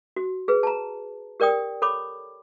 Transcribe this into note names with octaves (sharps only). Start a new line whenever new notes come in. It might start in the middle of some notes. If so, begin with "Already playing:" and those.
F#4
G#4 B4
A5 A#5
G4 A#4 D5 G5 D#6
A4 C#5 B5 D6